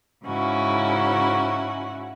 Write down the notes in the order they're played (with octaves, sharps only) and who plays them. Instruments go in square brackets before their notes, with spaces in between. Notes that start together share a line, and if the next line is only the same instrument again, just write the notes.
[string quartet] G#2 C#3 C#4 E4 F#4